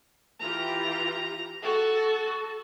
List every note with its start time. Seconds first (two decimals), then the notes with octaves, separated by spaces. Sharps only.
0.40 E3 F4 G4 A#5
1.63 F#4 A4 A5